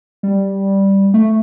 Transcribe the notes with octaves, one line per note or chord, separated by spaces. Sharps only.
G3
A3